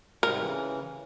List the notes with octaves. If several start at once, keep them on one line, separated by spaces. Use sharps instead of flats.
G#2 C3 G3 A#4
C#3 E3